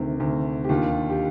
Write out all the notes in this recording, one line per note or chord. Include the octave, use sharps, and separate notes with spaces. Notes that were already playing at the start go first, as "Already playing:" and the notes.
Already playing: D2 C3 D#3
D2 C3 D#3
G4
D#2 D3 F4
G4